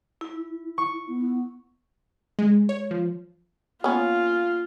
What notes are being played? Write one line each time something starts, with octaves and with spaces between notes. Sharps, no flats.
E4
C#6
B3
G#3
C#5
F3
A#3 B3 C#4 F4